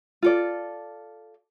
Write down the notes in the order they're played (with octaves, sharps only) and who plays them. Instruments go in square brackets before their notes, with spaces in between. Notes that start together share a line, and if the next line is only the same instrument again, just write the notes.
[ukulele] F4 A4 D5